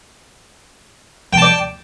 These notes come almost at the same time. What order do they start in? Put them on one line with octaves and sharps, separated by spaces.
G5 A5 D5